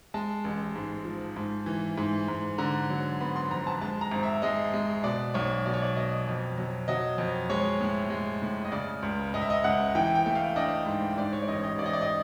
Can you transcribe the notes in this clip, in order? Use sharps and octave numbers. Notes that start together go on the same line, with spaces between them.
G#3 A5
A1
G#2
F3
G#2
E3
G#2
G#2
D3 A#5
F#3
B3 B5
C6
F2 A#5
A5
G#3 A5
A#5
G#1
E5
G#3 D#5
G#3
B2 D5
B1 C#5
B2 D5
C#5
D5
B2 D#5
F2
F#3
F#3 D#5
F2
G#3 C#5
A2
G#3
A2
D#5
C#3 D5
C#2
C#2 D#5
E5
D#5
C#2 F#5
E3 G5
G5
A3
F5
D4 D#5
G#2
G#2 D5
C#5
D5
A1 D#5
D#5
A1 D5
D#5
D5
D#5